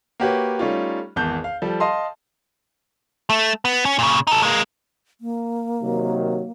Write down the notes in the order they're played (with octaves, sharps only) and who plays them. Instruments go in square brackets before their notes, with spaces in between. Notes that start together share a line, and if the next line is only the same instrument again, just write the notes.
[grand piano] A#3 F#4 G4 B4 C#5
G3 A3 C#4 D#4 F4
G#1 E2 A5 G6
F5
F3 G3 A4
D#5 F5 A5 C6
[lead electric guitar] A3
B3
C#4
A#2 C#3
D#4 A4
G#3 A#3
[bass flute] A#3
[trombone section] C3 D#3 F#3